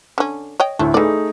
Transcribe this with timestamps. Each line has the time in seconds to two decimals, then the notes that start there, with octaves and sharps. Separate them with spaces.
0.18 D3 C#4
0.60 C#5 D#5 G5
0.79 D2 A2 A3
0.94 E3 A3 D#4 G#4 D5